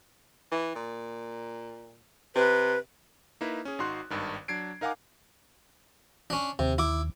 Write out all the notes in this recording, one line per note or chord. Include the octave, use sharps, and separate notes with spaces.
E3
A#2
C3 B4
A#3 D#4 E4 B4
C#4 G#4
G#1 D#4 F#4 C6 F#6
G#1 G2 D#3
F#3 D4 G#6 C7 D7
D#4 A#4 F5 F#5 G#5 D6
C#4 D4
D#2 C3
E4 D6